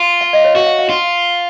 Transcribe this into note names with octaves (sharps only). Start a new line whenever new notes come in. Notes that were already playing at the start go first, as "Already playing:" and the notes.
Already playing: F4
F5
D#5
C#5
F#4 F5
F5
F5
F4